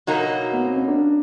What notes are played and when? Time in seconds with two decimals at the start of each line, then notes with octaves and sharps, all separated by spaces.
0.07 B2 F#3 A#3 D#4 F#4
0.52 B3
0.64 C4
0.76 C#4
0.88 D4